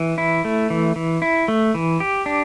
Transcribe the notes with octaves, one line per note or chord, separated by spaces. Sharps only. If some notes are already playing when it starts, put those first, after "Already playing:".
Already playing: E3
E4
A3
E3
E3
E4
A3
E3
G4
D4